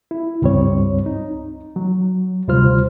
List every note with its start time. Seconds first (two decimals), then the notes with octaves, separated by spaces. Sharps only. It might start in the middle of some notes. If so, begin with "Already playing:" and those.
0.11 E4
0.42 C#2 G2 G3 C4 C#5
1.06 D#4
1.76 F#3
2.48 D2 C3 G3 F4 C5 F6